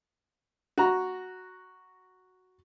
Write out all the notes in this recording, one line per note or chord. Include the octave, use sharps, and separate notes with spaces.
F#4 A#5